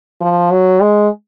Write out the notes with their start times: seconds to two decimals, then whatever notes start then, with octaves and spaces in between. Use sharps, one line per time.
0.21 F3
0.51 F#3
0.81 G#3